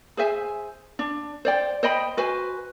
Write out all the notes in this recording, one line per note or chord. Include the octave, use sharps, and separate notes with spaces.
G#4 C5 E5 G#5
D4
C5 D5 G5
C5 D#5 G5 B5
F#4 B4 C5 G#5